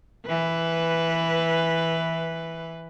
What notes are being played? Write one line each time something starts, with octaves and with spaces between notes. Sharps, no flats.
E3 B4